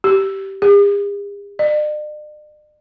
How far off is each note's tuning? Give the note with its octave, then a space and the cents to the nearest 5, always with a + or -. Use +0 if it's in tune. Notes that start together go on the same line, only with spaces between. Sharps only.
G4 -15
G#4 -45
D5 +45